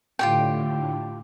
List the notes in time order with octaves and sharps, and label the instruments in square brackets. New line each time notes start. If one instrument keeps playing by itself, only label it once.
[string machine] A2 D3 [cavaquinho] F4 G4 G5